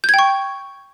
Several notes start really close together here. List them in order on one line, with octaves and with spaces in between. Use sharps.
G6 G#6 G5 C#6